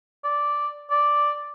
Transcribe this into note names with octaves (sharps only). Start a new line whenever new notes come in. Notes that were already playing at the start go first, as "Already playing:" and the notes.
D5
D5